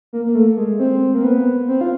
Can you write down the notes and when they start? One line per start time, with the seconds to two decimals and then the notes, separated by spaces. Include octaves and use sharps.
0.13 A#3
0.25 A#3
0.35 A3
0.57 G#3
0.79 C4
1.14 A#3
1.24 B3
1.68 C4
1.81 F4